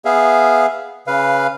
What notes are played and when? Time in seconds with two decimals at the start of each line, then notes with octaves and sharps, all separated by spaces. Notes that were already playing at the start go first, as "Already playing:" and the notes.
0.05 B3 G#4 E5 F5
1.07 C#3 B4 F5